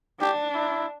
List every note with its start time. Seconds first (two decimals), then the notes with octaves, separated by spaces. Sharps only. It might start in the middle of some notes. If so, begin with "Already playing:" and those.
0.20 D4 G4
0.55 E4